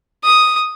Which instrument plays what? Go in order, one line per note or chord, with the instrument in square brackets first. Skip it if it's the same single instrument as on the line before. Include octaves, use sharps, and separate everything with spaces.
[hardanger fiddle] D#6